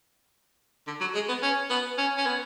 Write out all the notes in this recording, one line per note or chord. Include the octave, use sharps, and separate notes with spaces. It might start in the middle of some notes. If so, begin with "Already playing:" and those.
D3
F#3
G#3
B3
C#4
B3
C#4
C#4
B3